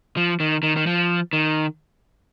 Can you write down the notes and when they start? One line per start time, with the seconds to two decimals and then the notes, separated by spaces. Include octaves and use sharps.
0.17 F3
0.40 D#3
0.63 D#3
0.76 D#3
0.87 F3
1.33 D#3